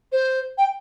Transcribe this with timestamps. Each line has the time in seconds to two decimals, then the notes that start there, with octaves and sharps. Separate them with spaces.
0.12 C5
0.58 G5